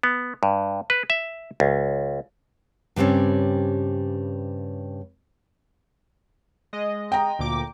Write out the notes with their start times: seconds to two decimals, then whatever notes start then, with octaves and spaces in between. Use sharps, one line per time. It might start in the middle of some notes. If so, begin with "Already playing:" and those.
0.04 B3
0.43 G2
0.90 B4
1.10 E5
1.60 C#2
2.96 G2 C#3 G3 C4 C#4
6.73 G#3 D#5
7.12 G5 A#5
7.39 D2 A#2 D6